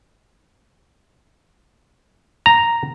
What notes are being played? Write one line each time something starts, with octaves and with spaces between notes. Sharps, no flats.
A#5